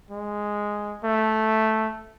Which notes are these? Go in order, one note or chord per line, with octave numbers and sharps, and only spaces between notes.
G#3
A3